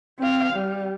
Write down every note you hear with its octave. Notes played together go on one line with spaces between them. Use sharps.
C4 F5
G3